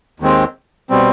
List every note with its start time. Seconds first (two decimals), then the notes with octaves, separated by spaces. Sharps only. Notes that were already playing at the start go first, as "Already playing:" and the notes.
0.20 D#2 D#3 G#3 C4
0.90 B2 G3 C4